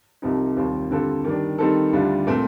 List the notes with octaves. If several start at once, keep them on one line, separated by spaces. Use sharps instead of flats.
C2 C3 F3 C4 D#4
D#2 D#3 G3 C4 F4
D3 G3 C4 F4 A4
D#3 G3 D4
D#3 G3 C4 D#4 A4
D2 D3 G3 D4 F4
A#2 A3 C4